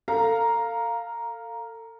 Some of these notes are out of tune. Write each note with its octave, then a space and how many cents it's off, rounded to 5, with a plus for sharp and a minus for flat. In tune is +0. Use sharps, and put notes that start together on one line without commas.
A4 +30 F5 +0 A#5 +5